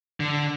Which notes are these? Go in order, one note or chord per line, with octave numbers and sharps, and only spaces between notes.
D3